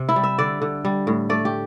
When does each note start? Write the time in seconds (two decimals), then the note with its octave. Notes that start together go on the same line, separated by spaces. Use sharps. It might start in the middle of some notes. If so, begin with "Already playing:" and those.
Already playing: C3
0.09 E4
0.16 G3
0.24 E5
0.39 D3 D5
0.62 D3
0.85 G3
1.07 A2
1.29 A3 D5
1.45 G4